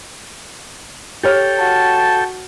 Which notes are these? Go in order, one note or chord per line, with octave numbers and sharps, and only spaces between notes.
G4 A4 C#5 G5 F6
F#4 A5